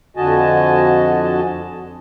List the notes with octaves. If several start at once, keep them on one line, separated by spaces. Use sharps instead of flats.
F2 D3 F#4 D#5 G#5 A5